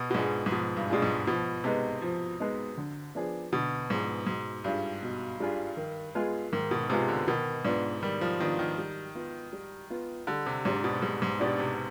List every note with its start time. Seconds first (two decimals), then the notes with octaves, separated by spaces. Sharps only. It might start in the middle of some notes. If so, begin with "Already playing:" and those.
Already playing: B2
0.11 B2
0.14 G#2 G#3 D4 F4 G#4
0.46 G#2
0.52 B2 F3
0.76 G2
0.89 B2 G#3 D4 F4 G#4
1.02 G#2
1.27 B2 F3
1.64 C3 G#3 B3 D#4
2.02 F3
2.40 G#3 B3 D#4
2.77 D3
3.15 F3 B3 D4 G#4
3.52 B2 D3
3.90 G#2 F3 B3 D4 G#4
4.27 G#2 B2
4.64 G2 G3 D4 F4 G#4
5.03 B2
5.40 G3 D4 F4 G#4
5.77 D#3
6.15 G#3 B3 F4 G#4
6.52 G#2 D#3
6.71 B2
6.90 C3 G#3 B3 F4 G#4
7.08 D3
7.27 B2 D#3
7.65 G#2 B3 D4 F4
8.02 D#3 G3
8.21 F3
8.40 D#3 B3 D4 F4
8.59 D#3
8.78 G3
9.15 B3 F4
9.53 G3
9.90 B3 F4
10.27 D3 G3
10.46 C3
10.65 G#2 D4 G4 D5
10.84 B2
11.02 G#2 G3
11.22 G#2
11.40 B2 D4 G4 D5
11.59 C3